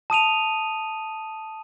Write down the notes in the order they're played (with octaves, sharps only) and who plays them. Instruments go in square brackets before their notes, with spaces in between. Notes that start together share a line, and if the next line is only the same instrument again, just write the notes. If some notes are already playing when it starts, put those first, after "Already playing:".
[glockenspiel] A5 D#6 D#7 F7